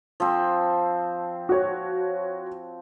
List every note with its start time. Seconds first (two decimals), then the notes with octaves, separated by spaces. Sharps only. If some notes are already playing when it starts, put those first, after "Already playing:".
0.20 F3 C4
1.49 F#4 C#5